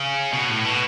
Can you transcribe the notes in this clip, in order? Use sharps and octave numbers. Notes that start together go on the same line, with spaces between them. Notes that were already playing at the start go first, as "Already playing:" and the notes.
Already playing: C#3
B2
A2
B2